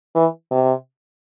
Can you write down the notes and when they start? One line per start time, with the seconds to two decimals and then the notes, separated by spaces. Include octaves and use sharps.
0.15 E3
0.51 C3